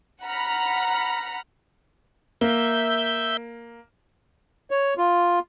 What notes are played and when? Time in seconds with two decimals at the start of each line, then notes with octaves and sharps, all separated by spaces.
0.23 F#5 A#5 B5 F6
2.41 A#3 E5 G6
4.71 C#5
4.98 F4